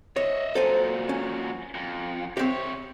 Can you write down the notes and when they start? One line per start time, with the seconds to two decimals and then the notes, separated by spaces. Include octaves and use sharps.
0.16 C#5 D#5 E5
0.55 A#2 F#3 A4 C5 G#5
1.09 C#4
1.74 F2
2.37 C3 C4 G4 C#5